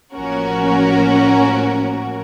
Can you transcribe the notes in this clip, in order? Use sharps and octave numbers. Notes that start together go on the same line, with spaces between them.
A1 F3 A#3 C#4 F#4 A#4